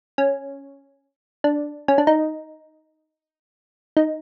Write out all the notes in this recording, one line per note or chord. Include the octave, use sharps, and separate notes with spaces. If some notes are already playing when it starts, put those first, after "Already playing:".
C#4
D4
C#4
D4
D#4
D#4